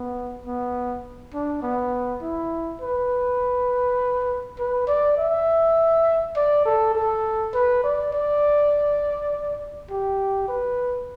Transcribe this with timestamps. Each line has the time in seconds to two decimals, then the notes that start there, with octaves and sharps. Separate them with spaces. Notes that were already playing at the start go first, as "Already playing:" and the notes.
Already playing: B3
0.46 B3
1.34 D4
1.63 B3
2.22 E4
2.82 B4
4.59 B4
4.88 D5
5.18 E5
6.36 D5
6.66 A4
6.95 A4
7.54 B4
7.84 D5
8.13 D5
9.91 G4
10.48 B4